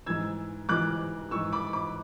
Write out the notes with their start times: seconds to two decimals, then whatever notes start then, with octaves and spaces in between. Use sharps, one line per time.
0.06 G#2 E3 E6 G#6
0.69 G#2 E3 D6 F#6
1.31 G#2 E3 C#6 E6
1.53 B5 D6
1.73 B5 D6